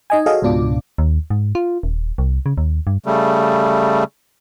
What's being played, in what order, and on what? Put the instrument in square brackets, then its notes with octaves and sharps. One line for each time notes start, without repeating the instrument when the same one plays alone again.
[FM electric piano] D#4 D#5 G#5
F#4 G#4 A4 C#5 D#5 F5
C#2 G#2 B2 D4 F4 D6
[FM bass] D#2
G#2
F4
D#1
C2
C#3
D#2
G2
[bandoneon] C#3 G3 A3